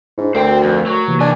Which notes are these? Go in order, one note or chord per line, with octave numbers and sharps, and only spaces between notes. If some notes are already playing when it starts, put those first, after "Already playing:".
G#2 D4 E4
D2 A3 F#4 A#4 C5 G5
F2
F#3
C3 E3 A#3
D#2 D4 G#5